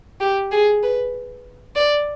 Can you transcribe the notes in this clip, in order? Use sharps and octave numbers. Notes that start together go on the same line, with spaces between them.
G4
G#4
B4
D5